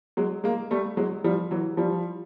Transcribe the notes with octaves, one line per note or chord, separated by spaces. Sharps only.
F#3 G#3
G#3 A#3
G3 A3
F#3 G#3
F3 G3
E3 F#3
F3 G3